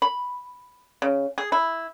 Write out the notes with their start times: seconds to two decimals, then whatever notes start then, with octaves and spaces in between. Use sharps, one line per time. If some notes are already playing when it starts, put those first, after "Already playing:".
0.02 B5
1.02 C#3
1.38 G#4
1.52 E4